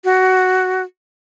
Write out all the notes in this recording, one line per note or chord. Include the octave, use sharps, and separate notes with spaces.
F#4